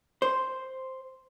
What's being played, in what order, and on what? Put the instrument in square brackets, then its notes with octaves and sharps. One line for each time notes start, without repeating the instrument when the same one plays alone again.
[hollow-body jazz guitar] C5